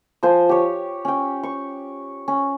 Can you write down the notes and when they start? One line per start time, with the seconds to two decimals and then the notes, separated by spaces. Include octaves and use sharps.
0.23 F3 C5 G#5
0.49 G4 C#5
1.05 C#4 G5
1.43 C#6
2.28 C#4